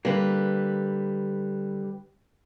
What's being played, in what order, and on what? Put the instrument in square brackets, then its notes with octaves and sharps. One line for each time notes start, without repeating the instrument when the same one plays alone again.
[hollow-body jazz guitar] D3 A#3 [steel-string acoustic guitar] G3 B4